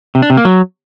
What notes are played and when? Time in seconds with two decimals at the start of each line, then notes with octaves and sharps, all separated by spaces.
0.15 C3
0.22 D4
0.30 C3
0.37 A#3
0.45 F#3